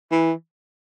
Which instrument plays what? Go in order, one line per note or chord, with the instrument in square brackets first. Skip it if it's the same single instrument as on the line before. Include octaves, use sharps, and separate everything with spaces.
[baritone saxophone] E3